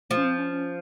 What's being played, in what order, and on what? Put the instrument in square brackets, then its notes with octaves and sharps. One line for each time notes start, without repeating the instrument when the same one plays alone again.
[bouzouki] F3 [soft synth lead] A3
[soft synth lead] C#4
C4
C#4
C#4